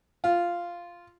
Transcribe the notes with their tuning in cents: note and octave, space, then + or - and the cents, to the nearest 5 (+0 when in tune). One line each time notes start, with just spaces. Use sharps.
F4 -5